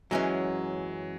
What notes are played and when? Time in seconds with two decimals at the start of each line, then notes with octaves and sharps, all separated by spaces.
0.11 F#2 E3 F#3 G#3 C#4